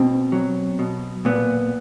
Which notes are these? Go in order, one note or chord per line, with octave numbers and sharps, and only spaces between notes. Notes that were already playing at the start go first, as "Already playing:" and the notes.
Already playing: B2 C4
F#3
B2
A#2 B3